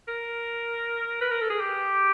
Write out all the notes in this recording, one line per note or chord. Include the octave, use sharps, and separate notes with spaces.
A#4
B4
A#4
A4
G#4
G4